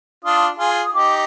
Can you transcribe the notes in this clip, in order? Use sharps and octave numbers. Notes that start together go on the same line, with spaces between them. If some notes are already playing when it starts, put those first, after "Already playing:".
D4 F4 D#6
F4 G#4
D#6
D#4 G4 D6